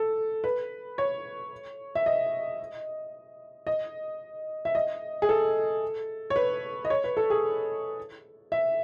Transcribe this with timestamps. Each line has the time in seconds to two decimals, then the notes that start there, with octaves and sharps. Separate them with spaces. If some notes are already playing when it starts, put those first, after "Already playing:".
Already playing: A4
0.44 B4
0.98 C#5
1.95 E5
2.06 D#5
3.67 D#5
4.65 E5
4.75 D#5
5.22 G#4
5.29 A4
6.30 C#5
6.36 B4
6.85 D#5
6.90 C#5
7.04 B4
7.17 A4
7.30 G#4
8.52 E5